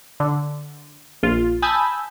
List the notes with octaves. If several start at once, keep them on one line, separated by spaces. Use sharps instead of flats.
D3
A#1 F4
G#5 A5 B5 D#6 E6 G6